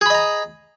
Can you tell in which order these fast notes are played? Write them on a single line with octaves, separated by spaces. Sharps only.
G#4 B5 D#5 A#5